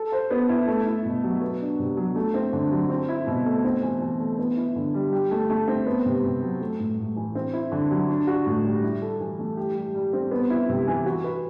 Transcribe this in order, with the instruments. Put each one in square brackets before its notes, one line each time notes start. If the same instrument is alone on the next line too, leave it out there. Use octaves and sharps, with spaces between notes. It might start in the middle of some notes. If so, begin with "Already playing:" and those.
Already playing: [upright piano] A4
C5
B3
E4
A3
E4
B2
F#3
B3
D4
C3
F#3
A3
C4
D3
F#3
C4
E4
B2
A3
C4
E3
E3
A3
B3
E4
D3
G3
G4
A3
A3
C4
B3
C3
C3
F#3
A3
A2
A2
E3
C4
E4
D3
F#3
D4
F#4
A2
G3
E4
A4
E3
A3
G4
G3
G3
C4
B3
E4
C3
E3
F#4
B4